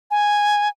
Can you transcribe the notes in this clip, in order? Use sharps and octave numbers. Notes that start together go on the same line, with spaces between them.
G#5